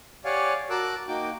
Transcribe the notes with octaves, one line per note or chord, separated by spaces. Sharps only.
G4 C#5 D5 F5 F#5 G#5
F#4 A#4 A5 D6 E6 F#6
A#3 D#4 F#4 G5 D6